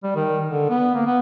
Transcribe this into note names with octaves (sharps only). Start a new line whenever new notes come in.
G3
D#3
D3
B3
A#3
B3